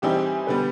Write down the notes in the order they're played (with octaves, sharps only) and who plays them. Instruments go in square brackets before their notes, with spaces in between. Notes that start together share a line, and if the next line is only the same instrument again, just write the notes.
[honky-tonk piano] E3 G3 C4 D#4 G#4 [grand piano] G4
[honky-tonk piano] D3 G3 B3 [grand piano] B4